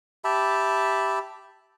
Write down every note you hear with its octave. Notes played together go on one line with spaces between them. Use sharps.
G4 E5 A5 B5